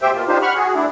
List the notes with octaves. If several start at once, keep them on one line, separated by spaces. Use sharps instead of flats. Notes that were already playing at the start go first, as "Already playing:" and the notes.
B2 A3 G4 C5 E5 G5
B2 A#3 F4
D4 D#4 F4 G4 C5
F#5 B5 C#6 F6
F#4 G#4
A3 D4 E4